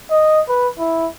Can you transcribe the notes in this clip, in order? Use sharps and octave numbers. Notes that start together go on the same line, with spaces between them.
D#5
B4
E4